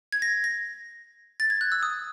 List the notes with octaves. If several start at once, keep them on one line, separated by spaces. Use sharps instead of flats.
G#6
A#6
A#6
A6
G#6
F#6
E6
D#6